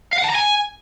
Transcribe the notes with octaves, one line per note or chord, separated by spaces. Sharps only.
F5
F#5
A5
A#5
G#5